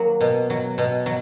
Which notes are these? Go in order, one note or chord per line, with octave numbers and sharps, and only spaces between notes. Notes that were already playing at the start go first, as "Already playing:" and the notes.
Already playing: F#3 A#3
B2
F#3
B2
F#3